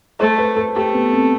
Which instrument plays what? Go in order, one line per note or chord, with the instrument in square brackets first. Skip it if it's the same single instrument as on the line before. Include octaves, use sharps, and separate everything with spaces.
[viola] A3 [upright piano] C5
[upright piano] B4
A4
[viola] A3 [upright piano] G4
[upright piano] B3
C4